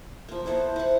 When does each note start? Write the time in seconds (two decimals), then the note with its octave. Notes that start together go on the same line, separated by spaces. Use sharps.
0.29 F3 A#3
0.46 B3 E4 A4 C5
0.76 E4 F#5